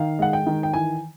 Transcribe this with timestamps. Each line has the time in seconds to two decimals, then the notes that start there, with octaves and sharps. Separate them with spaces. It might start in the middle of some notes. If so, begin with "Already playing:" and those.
Already playing: D#3 F5
0.19 G#3 F#5
0.33 G5
0.47 D#3
0.63 G5
0.74 E3 G#5